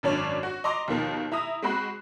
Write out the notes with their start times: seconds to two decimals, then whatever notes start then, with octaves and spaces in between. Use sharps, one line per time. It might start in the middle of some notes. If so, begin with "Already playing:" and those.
0.03 G#1 F#2 C#4 D4 C#5 D5
0.43 F#4
0.64 D#5 A#5 C6 D6
0.88 D#2 B2 D#3 F3
1.32 E4 A#5 D#6
1.62 G#3 C4 F#4 B5 F#6